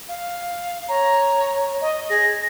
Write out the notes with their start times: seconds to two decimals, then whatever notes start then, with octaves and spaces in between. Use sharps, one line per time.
0.08 F5
0.89 C#5 A#5
1.81 D#5
2.10 G#4 A#6